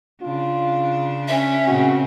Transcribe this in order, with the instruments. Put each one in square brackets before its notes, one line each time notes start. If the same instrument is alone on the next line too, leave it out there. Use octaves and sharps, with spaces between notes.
[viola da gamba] C#3 D4 [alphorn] F4
[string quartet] C#4 [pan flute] E5
[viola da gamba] A#2 C#3 C4 [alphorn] F#4